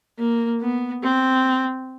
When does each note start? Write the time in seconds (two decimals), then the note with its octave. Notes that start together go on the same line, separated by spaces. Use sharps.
0.19 A#3
0.61 B3
1.03 C4